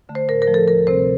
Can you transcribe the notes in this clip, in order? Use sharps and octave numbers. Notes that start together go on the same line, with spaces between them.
D3 A3
C5
A2 A#4
A#4
F3 A3
A4
D2 A#4
C3 G3 C4 C5